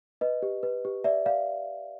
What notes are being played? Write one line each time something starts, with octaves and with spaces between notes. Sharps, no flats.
B4 D#5
G4
B4
G4
D5 E5
D5 F5